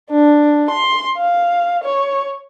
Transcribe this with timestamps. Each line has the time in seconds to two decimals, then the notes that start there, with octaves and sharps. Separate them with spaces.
0.11 D4
0.70 C6
1.17 F5
1.84 C#5